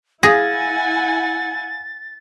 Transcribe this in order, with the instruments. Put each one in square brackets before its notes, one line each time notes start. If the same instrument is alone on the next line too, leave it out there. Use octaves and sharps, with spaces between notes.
[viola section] E4 F#5 G#5 [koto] G#4 [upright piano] F5 A#6 [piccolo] A6